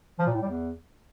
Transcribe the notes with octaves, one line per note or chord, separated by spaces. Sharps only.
F3
A#2
A2
G3
E2